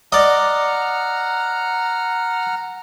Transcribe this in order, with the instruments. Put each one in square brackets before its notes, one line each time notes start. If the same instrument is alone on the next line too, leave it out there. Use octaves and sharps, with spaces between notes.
[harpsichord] D5 D#5 [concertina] F#5 A#5 F6